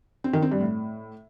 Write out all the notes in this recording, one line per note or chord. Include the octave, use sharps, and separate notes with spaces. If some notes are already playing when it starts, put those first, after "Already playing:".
C4
D#3
C4
G2
A2